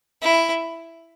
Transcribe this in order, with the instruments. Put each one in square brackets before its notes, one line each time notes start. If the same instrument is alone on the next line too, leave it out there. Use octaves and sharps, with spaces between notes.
[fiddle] E4